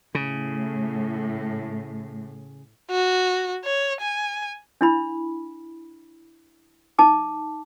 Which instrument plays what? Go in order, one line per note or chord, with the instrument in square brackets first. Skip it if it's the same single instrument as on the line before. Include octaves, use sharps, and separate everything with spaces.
[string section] A2 [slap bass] C#3
[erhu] F#4
C#5
G#5
[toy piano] D4 E4 B5
D#4 A5 D6